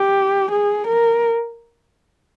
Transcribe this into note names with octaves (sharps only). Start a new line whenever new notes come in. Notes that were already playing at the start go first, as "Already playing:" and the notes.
Already playing: G4
G#4
A#4